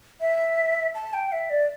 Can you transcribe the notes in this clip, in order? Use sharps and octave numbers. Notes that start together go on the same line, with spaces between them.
E5
A5
G5
E5
D5